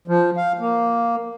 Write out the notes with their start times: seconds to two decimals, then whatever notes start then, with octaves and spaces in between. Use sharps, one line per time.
0.08 F3
0.37 F5
0.59 A#3